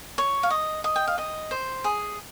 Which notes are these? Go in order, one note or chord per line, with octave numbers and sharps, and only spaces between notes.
C#5
F5
D#5
D#5
G5
F5
D#5
C5
G#4